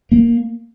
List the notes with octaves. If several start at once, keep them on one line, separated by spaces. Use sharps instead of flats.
A#3